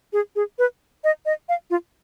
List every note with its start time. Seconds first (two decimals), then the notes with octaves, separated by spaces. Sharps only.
0.13 G#4
0.36 G#4
0.59 B4
1.04 D#5
1.26 D#5
1.49 F5
1.70 F4